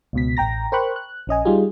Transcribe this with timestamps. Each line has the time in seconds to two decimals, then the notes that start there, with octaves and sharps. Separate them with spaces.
0.13 C#2 B2 B6
0.37 A1 G5 A#5 A#6
0.72 A#4 C5 G5 B5 C#6 F#6
0.96 F#6
1.27 A#1 C#4 D#5 G#5
1.45 G3 D#4 F4 G4 G#4